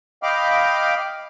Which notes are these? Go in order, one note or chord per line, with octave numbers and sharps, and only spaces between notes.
D#5 F5 G5 B5 D6 F6